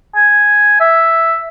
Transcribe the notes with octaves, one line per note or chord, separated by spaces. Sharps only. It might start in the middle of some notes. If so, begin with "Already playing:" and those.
G#5
E5